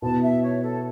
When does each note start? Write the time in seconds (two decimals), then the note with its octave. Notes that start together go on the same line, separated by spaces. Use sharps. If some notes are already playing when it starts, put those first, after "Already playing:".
0.02 B2 B3 E4 A5
0.22 E5
0.43 C#5
0.62 A4